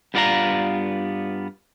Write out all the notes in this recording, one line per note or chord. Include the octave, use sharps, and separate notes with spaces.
G2 B3 F4 D5 F5 A#5